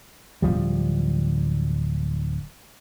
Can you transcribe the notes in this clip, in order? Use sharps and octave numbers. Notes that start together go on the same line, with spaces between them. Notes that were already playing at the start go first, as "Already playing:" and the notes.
D1 C2 F3 G3